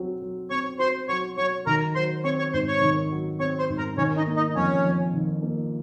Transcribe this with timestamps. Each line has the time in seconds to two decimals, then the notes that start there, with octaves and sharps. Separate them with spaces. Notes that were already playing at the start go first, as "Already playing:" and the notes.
Already playing: F#3 C4 F#4
0.22 F#3
0.50 C4 C#5 C#6
0.79 F#4 C5 C6
1.08 F#3 C#5 C#6
1.37 F#3 C#5 C#6
1.67 D#3 A#4 A#5
1.95 F#3 C5 C6
2.24 C4 C#5 C#6
2.39 C#5 C#6
2.53 G#2 C5 C6
2.68 C#5 C#6
2.81 D#3
3.11 F#3
3.40 C4 C#5 C#6
3.59 C5 C6
3.69 G#2
3.78 A#4 A#5
3.97 D#3 C#4 C#5
4.17 D#4 D#5
4.27 A#3
4.36 D#4 D#5
4.55 F2 C#4 C#5
4.84 F2
5.13 D#3
5.42 A#3